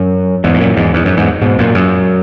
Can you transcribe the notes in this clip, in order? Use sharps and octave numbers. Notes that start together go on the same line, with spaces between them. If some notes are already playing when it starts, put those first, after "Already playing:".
Already playing: F#2
E2 G#2
G#2
F#2 A#2
E2 G#2
E2
F#2
E2 G#2
G#2 B2
F#2 A#2
F#2